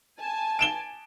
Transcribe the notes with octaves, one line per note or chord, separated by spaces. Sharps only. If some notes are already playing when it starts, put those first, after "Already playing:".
G#5 A5
D7 E7 G7